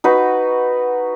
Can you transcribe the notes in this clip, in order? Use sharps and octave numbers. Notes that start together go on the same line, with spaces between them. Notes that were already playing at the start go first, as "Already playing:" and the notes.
D#4 F#4 B4